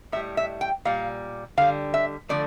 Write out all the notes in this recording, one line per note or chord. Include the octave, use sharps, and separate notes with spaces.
A2 G3 E5
E5
G5
A#2 G3 F5
D3 G3 F5
E5
D3 F3 A3 D5